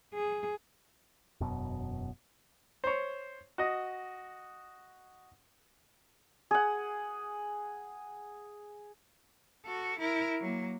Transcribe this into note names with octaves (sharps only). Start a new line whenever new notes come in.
G#4
E1 F#2 B2
C5 C#5
F#4 D#5
G#4 F#5
F#4 A4
E4 A#4
F#3 A#3